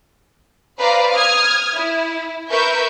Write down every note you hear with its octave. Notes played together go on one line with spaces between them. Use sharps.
B4 C5 D5 F5 A#5
D#6 F6 G#6
E4
A#4 B4 E5 C#6 G6